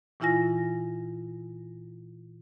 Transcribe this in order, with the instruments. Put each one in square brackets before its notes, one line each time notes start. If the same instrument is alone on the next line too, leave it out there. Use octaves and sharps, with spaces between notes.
[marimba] A#2 E3 E4 F4 G#5 A#6